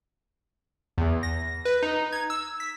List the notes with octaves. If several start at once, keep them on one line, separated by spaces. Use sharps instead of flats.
E2
A#6
B4
D#4
G#6
E6
B6